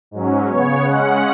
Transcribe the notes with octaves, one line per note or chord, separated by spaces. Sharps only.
G#2 F#3 C#4
C#3 B3 C#5
C#3 G#3 C#4 F#5